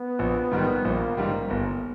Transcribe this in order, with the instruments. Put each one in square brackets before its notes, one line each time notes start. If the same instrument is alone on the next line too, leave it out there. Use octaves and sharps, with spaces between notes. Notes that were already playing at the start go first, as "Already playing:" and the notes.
Already playing: [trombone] B3
[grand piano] A#1
G#2 D#3 G3
[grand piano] A#1 [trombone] A#3
[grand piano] G#2 D#3 G3 [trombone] A#3
[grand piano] G1